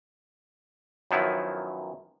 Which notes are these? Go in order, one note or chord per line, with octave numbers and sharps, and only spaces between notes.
F#2 D#3 F3 F#3 B3 E4